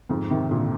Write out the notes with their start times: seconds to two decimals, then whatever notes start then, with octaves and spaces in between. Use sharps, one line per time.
0.09 F2 G#2
0.30 C3 D#3
0.51 A#2 D3